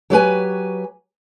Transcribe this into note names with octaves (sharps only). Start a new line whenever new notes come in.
F#3 G4 B4 G#5